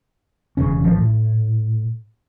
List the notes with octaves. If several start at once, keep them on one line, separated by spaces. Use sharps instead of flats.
E1 B1 C#3 C#4
A1 F3
A2